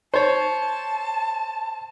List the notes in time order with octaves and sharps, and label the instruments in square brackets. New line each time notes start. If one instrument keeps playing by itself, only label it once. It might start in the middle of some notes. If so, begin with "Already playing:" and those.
[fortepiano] C5 C#5 [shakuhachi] A5